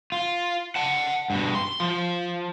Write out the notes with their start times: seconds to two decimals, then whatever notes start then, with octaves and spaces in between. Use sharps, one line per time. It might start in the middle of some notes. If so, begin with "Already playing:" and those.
0.12 F4
0.76 F#5 A5
1.30 G2 B2
1.55 C6
1.80 F3